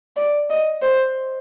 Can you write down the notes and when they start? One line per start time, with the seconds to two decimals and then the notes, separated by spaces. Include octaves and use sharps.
0.16 D5
0.50 D#5
0.82 C5